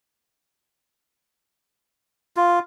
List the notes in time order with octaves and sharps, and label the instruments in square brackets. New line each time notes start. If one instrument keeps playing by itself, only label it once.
[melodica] F4